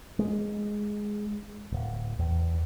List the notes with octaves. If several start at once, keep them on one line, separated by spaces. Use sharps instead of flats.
G#3
D1
E2